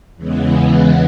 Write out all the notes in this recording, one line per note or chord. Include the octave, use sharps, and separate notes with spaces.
E2 C#3 E3 G#3 B3